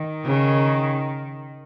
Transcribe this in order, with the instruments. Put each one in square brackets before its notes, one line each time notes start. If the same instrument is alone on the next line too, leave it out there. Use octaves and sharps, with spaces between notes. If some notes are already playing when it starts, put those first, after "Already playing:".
Already playing: [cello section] D#3
[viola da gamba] C#3